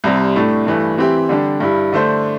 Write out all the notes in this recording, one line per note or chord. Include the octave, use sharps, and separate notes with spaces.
C2 C3 G3 C4
A2 A3 D4
G2 E3 A3
E3 C4 G4 E5
D3 G3 D4 G4
G2 G3 E4
D3 A3 D4 C5